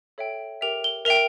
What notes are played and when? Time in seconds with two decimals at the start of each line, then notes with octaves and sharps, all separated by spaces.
0.18 A4 C#5 E5 G5
0.61 G4 A#4 E5 G5 F7
0.84 G7
1.05 A#4 E5 G5 F7